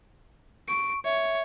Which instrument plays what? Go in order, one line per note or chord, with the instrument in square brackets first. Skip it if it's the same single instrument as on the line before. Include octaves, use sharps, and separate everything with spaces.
[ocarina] C#6 [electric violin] D7
[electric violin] C#5 [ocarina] E5